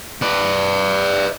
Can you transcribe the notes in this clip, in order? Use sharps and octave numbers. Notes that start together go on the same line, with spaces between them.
B4 D5